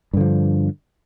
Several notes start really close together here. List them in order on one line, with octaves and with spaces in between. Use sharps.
G2 D3 F3